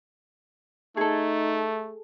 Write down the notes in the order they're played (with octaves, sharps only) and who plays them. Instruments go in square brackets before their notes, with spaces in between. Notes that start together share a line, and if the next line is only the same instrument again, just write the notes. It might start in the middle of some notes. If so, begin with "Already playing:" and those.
[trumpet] A3 [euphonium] D#4 [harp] G#4 A4